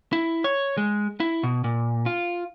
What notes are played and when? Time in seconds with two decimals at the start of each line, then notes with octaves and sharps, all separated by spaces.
0.13 E4
0.44 C#5
0.78 G#3
1.20 E4
1.43 B2
1.64 A#2
2.06 F4